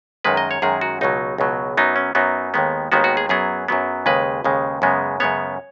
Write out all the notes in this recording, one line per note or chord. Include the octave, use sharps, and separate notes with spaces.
F#2 D#3 G#3 B4
D#5
C#5
F#2 D#3 G#3 G#4
F#4
C#2 B2 F#3 D#4
C#2 B2 F#3
F#2 F#3 B3 D#4
C#4
F#2 F#3 B3 D#4
D#2 D#3 G#3 B3
D#2 D#3 G#3 B3 F#4
F#4
G#4
F#2 F#3 B3 G#4
F#2 F#3 B3
D#2 C#3 G#3 B4
D#2 C#3 G#3
F#2 C#3 G#3 B3
F#2 C#3 G#3 B3 C#5